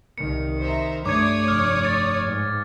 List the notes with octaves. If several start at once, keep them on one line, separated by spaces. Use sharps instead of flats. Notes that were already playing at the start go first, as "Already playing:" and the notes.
C2 D#3 C#7
C5 E5 A#5
G2 A3 C#5 D5 D6 D#6 G#6
F1 F6
A6
G#2